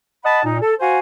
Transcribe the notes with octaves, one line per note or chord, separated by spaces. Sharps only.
D#5 F#5 A5 B5
A#2 D#4
A4
F#4 C5 F5 G#5